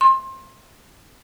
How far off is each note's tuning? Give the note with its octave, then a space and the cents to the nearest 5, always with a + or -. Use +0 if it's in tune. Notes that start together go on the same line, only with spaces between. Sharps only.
C6 +25